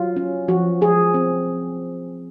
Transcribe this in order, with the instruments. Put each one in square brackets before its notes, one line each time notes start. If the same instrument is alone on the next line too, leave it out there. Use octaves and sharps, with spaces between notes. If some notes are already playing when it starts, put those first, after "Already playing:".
Already playing: [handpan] F#3 F4
C#4
F3 F#4
F3 G#4
C4